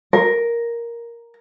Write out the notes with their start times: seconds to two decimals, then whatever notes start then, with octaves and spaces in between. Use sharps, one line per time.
0.13 A#4